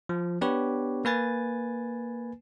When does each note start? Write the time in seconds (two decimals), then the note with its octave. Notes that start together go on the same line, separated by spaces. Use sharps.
0.09 F3
0.41 B3 D4 G4 B4 C#5
1.05 A#3 B4 G#5 A6